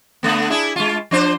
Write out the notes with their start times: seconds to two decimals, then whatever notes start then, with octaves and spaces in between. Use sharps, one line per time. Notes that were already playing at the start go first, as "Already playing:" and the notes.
0.23 D3 A3 B3
0.50 D4 E4 G#4
0.76 G#3 F4
1.11 F3 D4 C5